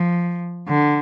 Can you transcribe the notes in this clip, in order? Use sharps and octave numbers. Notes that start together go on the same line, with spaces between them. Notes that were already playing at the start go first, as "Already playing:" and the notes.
Already playing: F3
D3